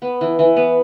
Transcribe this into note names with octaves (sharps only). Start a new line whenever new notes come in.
B3
E3
E3
B3